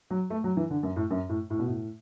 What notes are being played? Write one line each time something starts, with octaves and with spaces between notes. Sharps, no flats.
F#3
A3
F#3
E3
D3
F#2
A2
F#2
A2
A2
B2
A2